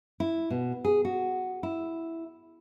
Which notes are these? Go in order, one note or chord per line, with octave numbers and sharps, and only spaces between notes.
E4
B2
G#4
F#4
E4